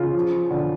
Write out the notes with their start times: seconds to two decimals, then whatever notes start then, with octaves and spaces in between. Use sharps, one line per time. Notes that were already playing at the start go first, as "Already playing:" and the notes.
Already playing: C#3 F4
0.15 F3
0.50 D3